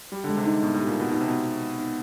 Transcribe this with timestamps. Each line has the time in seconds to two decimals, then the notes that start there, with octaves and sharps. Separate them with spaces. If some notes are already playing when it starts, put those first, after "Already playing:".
0.12 G3 G4
0.24 D3 G#3
0.37 C3
0.45 D#4
0.62 A2 B3
0.74 A2 G4
0.87 A#2
0.95 B2 G#3
1.12 B2 D#4
1.21 C3
1.28 B2 B3
1.45 G4
1.62 G#3
1.79 D#4